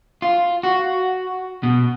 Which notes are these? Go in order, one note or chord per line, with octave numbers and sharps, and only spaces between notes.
F4
F#4
B2